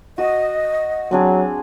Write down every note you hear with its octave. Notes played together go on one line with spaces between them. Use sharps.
F#4 D#5 D#6
F#3 C4 D4 G#4